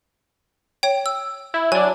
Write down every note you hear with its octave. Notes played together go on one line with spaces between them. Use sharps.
C#5 G5
E6
E4
F#3 D4 G#5